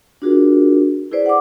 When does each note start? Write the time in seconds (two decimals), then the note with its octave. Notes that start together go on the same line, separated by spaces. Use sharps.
0.22 D4 F4 F#4 G#4 A#4
1.11 E4 G#4 B4 C5 D5
1.26 F#5 D6